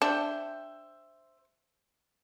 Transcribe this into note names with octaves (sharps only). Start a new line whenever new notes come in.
D4 C5 E5 G5